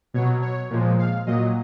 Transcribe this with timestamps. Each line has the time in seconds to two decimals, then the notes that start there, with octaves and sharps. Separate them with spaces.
0.14 B2 F#3 C#5
0.42 C#5
0.70 A#2 F3 G#3
0.99 F5
1.26 A#2 F#3 D#5